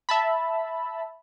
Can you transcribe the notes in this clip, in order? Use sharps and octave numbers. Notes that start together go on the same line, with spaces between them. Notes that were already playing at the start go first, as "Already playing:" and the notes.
E5 A5 B5